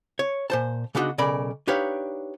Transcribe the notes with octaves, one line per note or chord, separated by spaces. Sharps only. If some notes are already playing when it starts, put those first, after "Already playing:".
C#5
A#2 C5 A5
C#3 B3 D4 D#4 F#4
B1 C#3 A#4 D5 B5
D4 D#4 G4 B4 C#5 F5